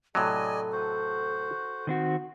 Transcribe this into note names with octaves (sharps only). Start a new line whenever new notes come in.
A2 C3 F#3 A4 D5 D#5 G#5
F#4 C5
D#3 C4 F#4